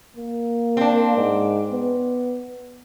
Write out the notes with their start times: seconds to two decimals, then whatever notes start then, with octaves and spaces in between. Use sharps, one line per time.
0.16 A#3
0.77 C4 D4
1.16 G#2
1.71 B3